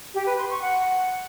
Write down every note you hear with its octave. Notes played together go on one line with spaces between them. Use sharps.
G4
B4
C6
C#6
F#5